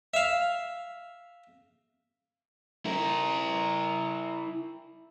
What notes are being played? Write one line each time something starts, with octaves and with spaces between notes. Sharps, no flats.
E5 F5
E4 A#4